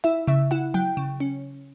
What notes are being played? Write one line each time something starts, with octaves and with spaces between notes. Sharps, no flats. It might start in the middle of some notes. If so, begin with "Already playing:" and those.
E4 E5
C#3 E5
E4 F#5
F#3 G5
C#3
C#4